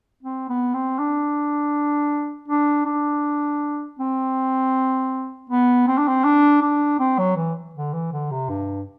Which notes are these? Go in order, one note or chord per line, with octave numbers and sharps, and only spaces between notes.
C4
B3
C4
D4
D4
D4
C4
B3
C4
D4
C4
D4
D4
C4
F#3
E3
D3
E3
D3
C3
G2